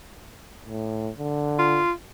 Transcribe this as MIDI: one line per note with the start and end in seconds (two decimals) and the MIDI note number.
0.65 1.11 45
1.18 1.82 50
1.59 1.91 65